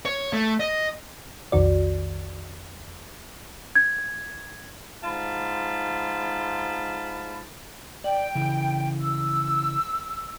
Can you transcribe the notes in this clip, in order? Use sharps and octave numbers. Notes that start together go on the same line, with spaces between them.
C#5
A3
D#5
B1 F2 D#3 F#4 D5
G#6
G#2 F4 A5 B5
D5 G5
C#3 E3
E6